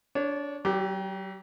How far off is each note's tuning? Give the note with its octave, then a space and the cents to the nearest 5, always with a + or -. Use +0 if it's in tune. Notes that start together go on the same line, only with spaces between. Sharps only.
D4 -20 C#5 +0
F#3 +40 G4 +0 D6 +0